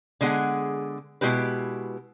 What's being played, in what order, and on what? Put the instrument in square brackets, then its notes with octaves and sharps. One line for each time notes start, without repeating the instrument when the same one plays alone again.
[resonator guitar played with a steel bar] D3 G#3 B3 G#4 F#5
B2 G#3 E4 G4 B4